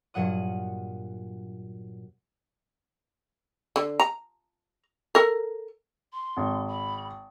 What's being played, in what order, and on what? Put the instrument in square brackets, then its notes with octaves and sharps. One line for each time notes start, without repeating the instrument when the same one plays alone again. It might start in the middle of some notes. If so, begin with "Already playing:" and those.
[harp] G2 A#2 F#3 F#5 D#6
[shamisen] D3
A#5
A4 A#4
[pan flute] C6
[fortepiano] G#1
[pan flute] B5